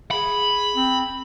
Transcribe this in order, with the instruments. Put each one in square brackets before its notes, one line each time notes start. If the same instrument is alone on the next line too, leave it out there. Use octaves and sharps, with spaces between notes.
[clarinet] G#4 [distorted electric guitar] B5
[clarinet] C4